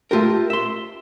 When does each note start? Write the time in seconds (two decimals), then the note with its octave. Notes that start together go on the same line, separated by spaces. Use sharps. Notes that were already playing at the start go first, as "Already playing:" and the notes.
0.11 A3 F4 G4 A#4
0.50 E5 C6